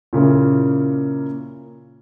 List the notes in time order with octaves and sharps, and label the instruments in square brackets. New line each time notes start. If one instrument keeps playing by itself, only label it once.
[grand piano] A#2 C#3 A#3 E4